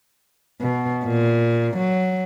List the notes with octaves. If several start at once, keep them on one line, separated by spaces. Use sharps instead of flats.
B2
A#2
F#3